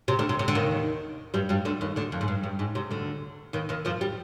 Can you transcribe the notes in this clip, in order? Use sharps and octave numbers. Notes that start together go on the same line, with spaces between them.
C3
D2 D3
C3
C3
D3
D#2 D#3
G2 G3
G2 G3
D2 D3
D#2 D#3
D2 D3
F2
G#2
G2
G2
G#2
C3
D2 D3
D#2 D#3
D#2 D#3
F2 F3
G3